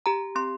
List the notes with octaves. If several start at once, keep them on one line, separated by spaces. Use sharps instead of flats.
G4 A#5
C4 C6